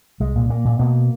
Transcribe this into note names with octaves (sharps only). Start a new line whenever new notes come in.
C2 G#3
A#2
A#2 A#3
A#2
B2 A#3